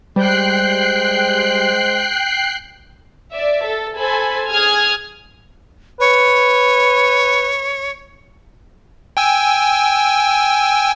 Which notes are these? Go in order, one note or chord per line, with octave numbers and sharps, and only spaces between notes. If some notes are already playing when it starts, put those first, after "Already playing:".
G3 G#3 C5 G5 F#6 C7
D5 E5
A4
A4 C5 G#5 B5
G#4 D#6 F6 G#6
B4 C#5
G5 G#5 E6